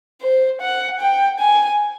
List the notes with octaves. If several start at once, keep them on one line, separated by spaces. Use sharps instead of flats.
C5
F#5
G5
G#5